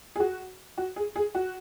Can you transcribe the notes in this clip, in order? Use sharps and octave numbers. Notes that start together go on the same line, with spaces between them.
G#4
F#4
F#4
G#4
G#4
F#4